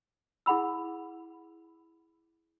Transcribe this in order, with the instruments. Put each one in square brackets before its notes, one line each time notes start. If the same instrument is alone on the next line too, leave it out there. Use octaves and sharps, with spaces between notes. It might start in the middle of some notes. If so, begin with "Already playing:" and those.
[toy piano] E4 G#4 F#5 B5 E6